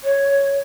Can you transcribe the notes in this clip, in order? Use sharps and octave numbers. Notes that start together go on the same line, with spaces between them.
C#5